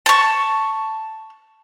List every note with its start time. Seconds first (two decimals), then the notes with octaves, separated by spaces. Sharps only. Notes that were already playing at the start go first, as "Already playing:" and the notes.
0.06 A5 C#6